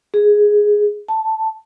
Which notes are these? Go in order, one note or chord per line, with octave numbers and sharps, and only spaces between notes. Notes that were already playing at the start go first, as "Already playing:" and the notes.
G#4
A5